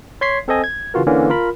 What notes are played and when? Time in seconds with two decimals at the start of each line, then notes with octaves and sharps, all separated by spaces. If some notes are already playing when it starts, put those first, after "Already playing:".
0.21 C#5 C6 G#6 B6 C7
0.48 C4 A4 C5 D#5 G#5
0.64 G#6
0.94 C#3 E3 F4 F#4 A#4
1.07 D3 E3 A#3 C#4
1.29 F4 A#4 B5